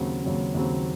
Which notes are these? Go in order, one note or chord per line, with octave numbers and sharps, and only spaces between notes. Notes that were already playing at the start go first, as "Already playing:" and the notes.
Already playing: D#2 C#3 F#3 C4
D#2 C#3 F#3 C4
D#2 C#3 F#3 C4